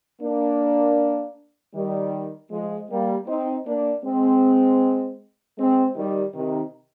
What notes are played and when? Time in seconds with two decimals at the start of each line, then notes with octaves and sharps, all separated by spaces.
0.22 A#3 D4
1.75 D#3 G3
2.51 F3 G#3
2.91 G3 A#3
3.28 C4 D#4
3.67 A#3 D4
4.04 G#3 C4
5.58 G#3 C4
5.96 D#3 G3
6.35 C3 D#3